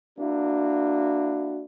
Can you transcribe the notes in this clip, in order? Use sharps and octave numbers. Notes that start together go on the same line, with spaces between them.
A#3 D4 E4 F#4